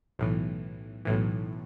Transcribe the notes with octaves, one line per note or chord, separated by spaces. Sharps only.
B1 A2 E3
B1 A2 E3